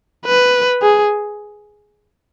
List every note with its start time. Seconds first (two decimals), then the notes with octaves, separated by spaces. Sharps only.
0.26 B4
0.82 G#4